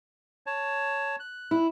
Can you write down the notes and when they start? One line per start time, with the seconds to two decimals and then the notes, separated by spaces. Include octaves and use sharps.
0.46 C#5 A5
1.20 F#6
1.51 E4